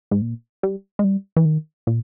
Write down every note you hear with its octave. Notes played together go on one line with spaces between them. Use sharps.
G#2
A#2
G3
G#3
G3
E3
D#3
A#2